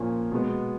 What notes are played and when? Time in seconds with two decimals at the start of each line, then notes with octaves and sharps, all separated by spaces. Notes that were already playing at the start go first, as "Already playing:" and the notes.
Already playing: A#2 F3 A#3 C#4 G#5
0.31 B2 G#3 B3